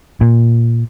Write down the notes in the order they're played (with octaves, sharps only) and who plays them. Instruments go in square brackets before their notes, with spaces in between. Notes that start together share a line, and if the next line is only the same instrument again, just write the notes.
[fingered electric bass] A#2